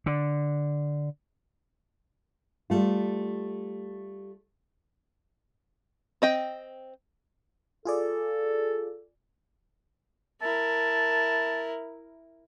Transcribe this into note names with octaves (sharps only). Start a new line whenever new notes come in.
D3
G3 A3 F4
C4 D#5 G5
F4 G#4 A4 D5
E4 A#4 A5